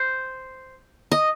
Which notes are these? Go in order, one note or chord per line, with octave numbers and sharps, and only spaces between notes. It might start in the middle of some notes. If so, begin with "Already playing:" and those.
Already playing: C5
D#5